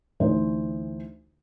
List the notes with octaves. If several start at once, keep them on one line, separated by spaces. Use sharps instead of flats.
D2 D3 E3 D#4 C5